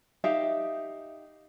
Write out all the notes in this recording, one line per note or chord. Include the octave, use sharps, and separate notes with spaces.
D#4 G4 E5 F5